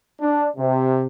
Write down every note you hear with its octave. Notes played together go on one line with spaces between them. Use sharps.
D4
C3